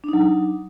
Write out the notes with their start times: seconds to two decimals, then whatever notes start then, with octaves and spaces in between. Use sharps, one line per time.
0.04 D4
0.09 D#4
0.13 F#3